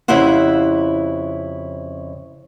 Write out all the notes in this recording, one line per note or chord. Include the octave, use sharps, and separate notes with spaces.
F2 C#3 E4 G4 C5 F#5